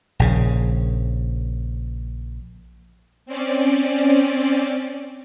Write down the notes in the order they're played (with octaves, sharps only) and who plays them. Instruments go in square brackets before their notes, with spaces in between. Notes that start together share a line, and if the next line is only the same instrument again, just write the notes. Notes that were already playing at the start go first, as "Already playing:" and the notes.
[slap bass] A#1 C#3
[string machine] C4 C#4 D5